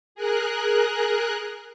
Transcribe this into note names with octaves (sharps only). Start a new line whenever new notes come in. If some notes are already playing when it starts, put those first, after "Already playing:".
G#4 A#4 F#6